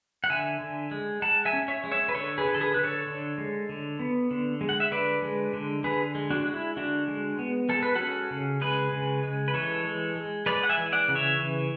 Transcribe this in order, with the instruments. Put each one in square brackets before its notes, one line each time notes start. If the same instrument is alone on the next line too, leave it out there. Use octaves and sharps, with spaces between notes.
[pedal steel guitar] F#5
D3 E5 G#5
D3
G#3
G#3 F#5 A5
E5 G#5
C#4
C#5 E5
G#3
C#5 E5
B4
D3 A4 C#5
G#4 B4
D3
A4
G#4 B4
D3 B4
A4 C#5
D3
G#3
D3
B3
D3
G#3
F#5
E5
D3 B4 D5
G#3
D3
D3 G#4 B4
G#3
D4 F#4
G#3
E4
D3 D4 F#4
G#3
B3
G#3 A4
B4
C#4 F#4 A4
C#3
G#3 G#4 B4
C#3
G#3
B4
E3 A4 C#5
G#3
G#3
G#3 B4 D5
F#5
E5 G#5
E3
D5 F#5
C#3
C#5 E5
E3